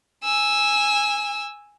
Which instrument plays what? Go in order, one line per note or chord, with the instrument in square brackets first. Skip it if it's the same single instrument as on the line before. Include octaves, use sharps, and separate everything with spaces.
[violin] G#5 E6